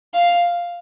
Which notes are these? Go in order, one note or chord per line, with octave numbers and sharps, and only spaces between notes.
F5